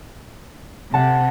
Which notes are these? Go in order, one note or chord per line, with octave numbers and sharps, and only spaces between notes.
C3 F#5 A5